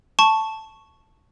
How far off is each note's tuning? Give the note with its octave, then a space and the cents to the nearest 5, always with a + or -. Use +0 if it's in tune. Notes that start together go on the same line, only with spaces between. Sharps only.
A5 +0 C#6 +0